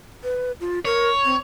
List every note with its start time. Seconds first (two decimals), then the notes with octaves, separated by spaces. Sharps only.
0.24 B4
0.61 F4
0.85 A#4 C#5
1.25 C4